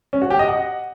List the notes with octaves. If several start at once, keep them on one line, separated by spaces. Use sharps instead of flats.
C#4
F#4
G4
D#5
F#5